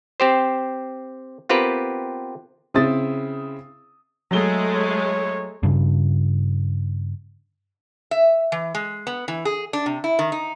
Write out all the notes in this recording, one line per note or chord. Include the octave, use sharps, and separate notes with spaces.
C4 G4 C5
B3 C4 F4 G4 A#4 B4
C#3 C4 E4 D#6 A6
F#3 G#3 A3 G7
C#5
G2 C#3
E5
E3
G#3
B3
E3
G#4
D4
C3
E4
D#3
D#4